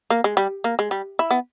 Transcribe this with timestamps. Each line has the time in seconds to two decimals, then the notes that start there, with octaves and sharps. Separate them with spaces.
0.10 A#3
0.24 G#3
0.37 G3
0.64 A#3
0.79 G#3
0.91 G3
1.19 E4
1.31 B3